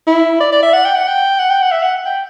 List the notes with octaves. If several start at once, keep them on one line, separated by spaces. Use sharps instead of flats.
E4
D5
D5
E5
F#5
G5
F#5
G5
F#5
G5
F#5
E5
F#5
G5